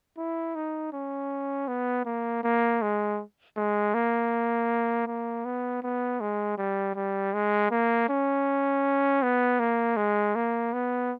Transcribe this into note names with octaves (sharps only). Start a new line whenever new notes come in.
E4
D#4
C#4
B3
A#3
A#3
G#3
G#3
A#3
A#3
B3
B3
G#3
G3
G3
G#3
A#3
C#4
B3
A#3
G#3
A#3
B3